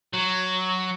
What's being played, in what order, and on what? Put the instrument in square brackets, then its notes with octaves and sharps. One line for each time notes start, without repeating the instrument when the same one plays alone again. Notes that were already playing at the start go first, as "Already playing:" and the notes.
[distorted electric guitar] F#3